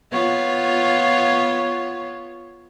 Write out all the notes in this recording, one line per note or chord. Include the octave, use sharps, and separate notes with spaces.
B3 F4 C#5